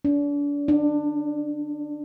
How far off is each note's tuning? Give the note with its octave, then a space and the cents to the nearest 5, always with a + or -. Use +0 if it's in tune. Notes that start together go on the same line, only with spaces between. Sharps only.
D4 -35
D4 +20